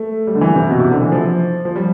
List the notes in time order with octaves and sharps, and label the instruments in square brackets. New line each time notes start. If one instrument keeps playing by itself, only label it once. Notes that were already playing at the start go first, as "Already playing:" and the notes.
Already playing: [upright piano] A3
G3
D3
E3
C3
B2
C3
D3
E3
F3
F3
G3